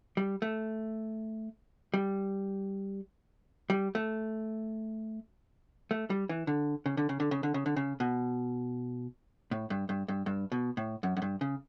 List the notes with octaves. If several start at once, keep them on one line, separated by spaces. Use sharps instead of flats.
G3
A3
G3
G3
A3
A3
G3
E3
D3
C#3
D3
C#3
D3
C#3
D3
C#3
D3
C#3
B2
A2
G2
G2
G2
G2
B2
A2
F#2
F#2
G2
C#3